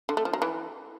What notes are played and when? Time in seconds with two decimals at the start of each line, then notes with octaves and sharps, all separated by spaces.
0.09 D3
0.17 A3
0.25 F3
0.33 F#3
0.42 E3